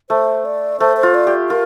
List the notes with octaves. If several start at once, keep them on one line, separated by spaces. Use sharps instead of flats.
A3 C5
D5
A3 C5
C5
F4
D5
G4
F4 A#4